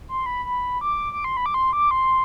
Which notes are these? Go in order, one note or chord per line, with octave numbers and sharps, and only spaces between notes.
C6
B5
B5
D6
D6
C6
B5
D6
C6
D6
C6